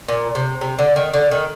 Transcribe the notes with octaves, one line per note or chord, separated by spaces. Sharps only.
A#2
C3
C3
D3
D#3
D3
D#3